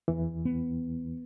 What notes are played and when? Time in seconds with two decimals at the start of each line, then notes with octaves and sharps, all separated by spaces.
0.08 E2 E3
0.45 B3